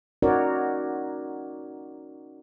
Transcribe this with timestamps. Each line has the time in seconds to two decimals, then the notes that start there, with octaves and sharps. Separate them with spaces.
0.22 C#4 D#4 F#4 A#4 C#5 D5